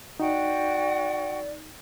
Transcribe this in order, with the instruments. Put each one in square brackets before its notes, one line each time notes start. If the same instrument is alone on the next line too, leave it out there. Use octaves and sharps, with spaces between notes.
[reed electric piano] D#4 [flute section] F#4 F#5 G5 [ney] D5